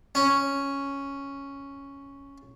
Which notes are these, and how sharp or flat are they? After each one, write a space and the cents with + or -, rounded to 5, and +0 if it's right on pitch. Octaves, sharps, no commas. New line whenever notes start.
C#4 +0